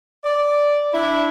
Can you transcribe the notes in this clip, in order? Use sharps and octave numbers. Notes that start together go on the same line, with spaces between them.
D5
D4 E4